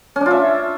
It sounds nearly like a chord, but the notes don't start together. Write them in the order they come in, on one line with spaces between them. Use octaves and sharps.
C#4 D4 F4 E5